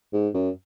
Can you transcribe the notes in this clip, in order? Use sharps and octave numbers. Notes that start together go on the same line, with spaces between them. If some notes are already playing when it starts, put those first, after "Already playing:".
G#2
F#2